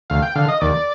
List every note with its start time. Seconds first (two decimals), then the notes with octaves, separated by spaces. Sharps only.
0.10 D2 F5
0.22 G5
0.35 D3 F5
0.48 D#5
0.61 D#2 D5